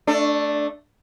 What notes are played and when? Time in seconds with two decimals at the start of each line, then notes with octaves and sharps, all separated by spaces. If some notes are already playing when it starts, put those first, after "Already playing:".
0.07 A3 D4